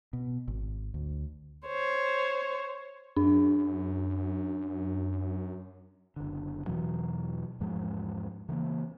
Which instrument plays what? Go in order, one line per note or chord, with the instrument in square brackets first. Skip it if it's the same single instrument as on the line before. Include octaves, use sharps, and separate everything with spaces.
[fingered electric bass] B2
G#1
D2
[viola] C5 C#5
[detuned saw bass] F#2 [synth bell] D4
[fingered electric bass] F#1 D3
E2 B2 E3 F#3
E2 G#2 F3 G#3
C#3 E3 A3 A#3